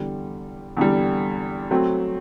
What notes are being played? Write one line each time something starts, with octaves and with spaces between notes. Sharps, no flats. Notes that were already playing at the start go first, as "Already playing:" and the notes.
Already playing: E2 D3 G3
E2 D3 G3
F#3 A3 C4